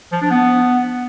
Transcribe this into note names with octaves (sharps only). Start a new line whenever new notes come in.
F3
D4
B3